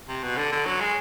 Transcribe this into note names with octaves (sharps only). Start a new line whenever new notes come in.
C3
B2
D3
D3
F#3
G#3